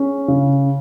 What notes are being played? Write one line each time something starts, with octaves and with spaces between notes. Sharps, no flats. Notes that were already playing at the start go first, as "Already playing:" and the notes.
Already playing: C#4 G#4
C#3